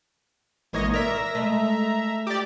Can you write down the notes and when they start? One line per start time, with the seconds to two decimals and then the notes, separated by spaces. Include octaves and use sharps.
0.73 A1 G#3 A#3 D#4 C#5 D#5
0.94 A#4 D5 E5 A#5
1.35 G#3 A3
2.27 G4 D5